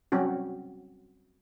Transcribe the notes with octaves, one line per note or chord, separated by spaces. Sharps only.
F#3 G3 C4 C#4 F#4